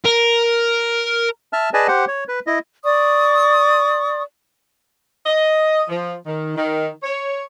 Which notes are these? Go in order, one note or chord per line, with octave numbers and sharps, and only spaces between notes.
A#4
E5 A5 F6
G#4 B4 D5 D#5 G#5 A5
G4 C5 F#5
C#5
B4
E4 D#5
D5 C#6 D#6
D#5
F3
D#3
D#3
C#5